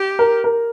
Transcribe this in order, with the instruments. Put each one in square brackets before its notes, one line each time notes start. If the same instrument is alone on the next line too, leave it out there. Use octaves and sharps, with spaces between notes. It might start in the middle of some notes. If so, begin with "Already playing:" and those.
Already playing: [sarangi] G4
[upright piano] A#4
A#4